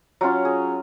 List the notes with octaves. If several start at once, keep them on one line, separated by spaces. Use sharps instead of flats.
F#3 C#4 F4
G#4